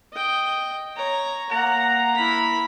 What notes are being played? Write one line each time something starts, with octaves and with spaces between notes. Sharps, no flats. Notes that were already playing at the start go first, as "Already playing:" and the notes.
D#5 G5
C#5 A#5
A#3 F#5 A#5
E4 B5